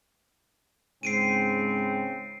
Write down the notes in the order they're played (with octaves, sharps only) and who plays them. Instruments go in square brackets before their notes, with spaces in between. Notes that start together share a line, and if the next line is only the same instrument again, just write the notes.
[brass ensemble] G#2 C#3 C4 [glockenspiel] C7 D7 D#7